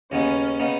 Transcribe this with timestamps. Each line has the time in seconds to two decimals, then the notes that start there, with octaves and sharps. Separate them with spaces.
0.12 D#2 C#3 B3 C#4 D#4
0.59 C#3 B3 D#4